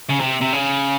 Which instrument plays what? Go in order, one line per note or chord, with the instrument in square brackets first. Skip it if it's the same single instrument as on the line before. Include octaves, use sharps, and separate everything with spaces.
[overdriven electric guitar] C#3
C3
C3
C#3